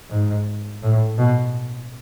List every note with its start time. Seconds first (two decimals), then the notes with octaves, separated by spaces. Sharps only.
0.10 G#2
0.82 A2
1.19 B2